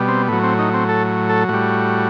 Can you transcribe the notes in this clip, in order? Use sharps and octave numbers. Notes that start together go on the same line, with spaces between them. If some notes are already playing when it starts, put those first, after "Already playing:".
Already playing: B2 G3
C4
A2 F#3 B3
C4
D#4
C4
A4
A4
A2 G3 F#4